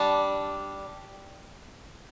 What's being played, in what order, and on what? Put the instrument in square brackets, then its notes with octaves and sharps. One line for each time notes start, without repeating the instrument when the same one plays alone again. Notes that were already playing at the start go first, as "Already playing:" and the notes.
Already playing: [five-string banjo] G3 D4 A5